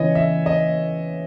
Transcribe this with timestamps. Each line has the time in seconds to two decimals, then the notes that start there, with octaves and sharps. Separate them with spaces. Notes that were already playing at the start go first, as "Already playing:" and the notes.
Already playing: C#3 E3 E4 C#5 D#5
0.15 E5
0.46 D#5